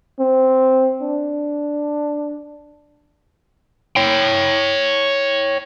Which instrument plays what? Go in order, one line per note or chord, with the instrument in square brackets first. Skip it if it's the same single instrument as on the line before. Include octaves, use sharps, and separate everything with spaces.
[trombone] C4
D4
[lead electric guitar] C#5 G5